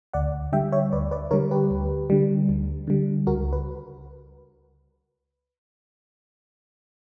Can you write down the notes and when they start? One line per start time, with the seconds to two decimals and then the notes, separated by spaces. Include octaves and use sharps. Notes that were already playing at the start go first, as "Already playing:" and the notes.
0.13 D2 D5 F#5
0.53 D3 G3 E5 G5
0.72 C#5 E5
0.92 D2 B4 D5
1.11 B4 D5
1.31 D3 G3 A#4 C#5
1.51 G4 B4
1.71 D2
2.10 D3 G3
2.49 D2
2.87 D3 G3
3.27 C#2 F#4 A#4
3.53 B4